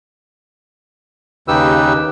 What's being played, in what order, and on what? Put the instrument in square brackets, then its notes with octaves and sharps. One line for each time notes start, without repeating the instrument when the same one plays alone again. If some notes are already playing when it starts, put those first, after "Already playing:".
[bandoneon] D#2 C#3 D#4 G4 B4 E6